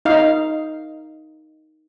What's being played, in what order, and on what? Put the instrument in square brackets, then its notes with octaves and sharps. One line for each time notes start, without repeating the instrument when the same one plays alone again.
[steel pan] D#4 F5